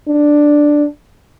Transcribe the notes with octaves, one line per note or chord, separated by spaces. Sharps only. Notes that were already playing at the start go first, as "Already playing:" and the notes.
D4